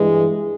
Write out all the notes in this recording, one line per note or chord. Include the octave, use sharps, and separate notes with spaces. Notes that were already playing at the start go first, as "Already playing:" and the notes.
Already playing: G2 E3 G#3